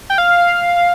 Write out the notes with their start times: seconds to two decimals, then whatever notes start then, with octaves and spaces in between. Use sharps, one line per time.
0.10 G5
0.18 F5